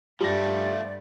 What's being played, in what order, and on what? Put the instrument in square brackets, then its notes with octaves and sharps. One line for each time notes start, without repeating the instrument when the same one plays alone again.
[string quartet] G2 [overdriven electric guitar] F3 A3 [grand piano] G3 A#6 [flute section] D5